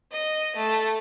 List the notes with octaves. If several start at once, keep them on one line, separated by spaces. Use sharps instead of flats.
D#5
A3